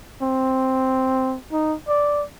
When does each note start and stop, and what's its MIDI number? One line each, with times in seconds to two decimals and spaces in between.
0.22 1.37 60
1.52 1.75 63
1.88 2.24 74